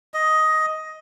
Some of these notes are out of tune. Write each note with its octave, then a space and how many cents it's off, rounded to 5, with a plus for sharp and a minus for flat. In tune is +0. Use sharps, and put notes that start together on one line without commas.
D#5 +10